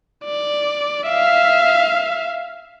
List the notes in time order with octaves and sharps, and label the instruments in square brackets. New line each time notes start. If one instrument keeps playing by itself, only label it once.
[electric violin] D5
E5 F5